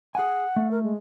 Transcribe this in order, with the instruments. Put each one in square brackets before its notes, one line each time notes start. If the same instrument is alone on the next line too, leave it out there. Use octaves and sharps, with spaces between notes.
[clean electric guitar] G#4 G#5 [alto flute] F#5
[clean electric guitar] A3
[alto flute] A#4
G#3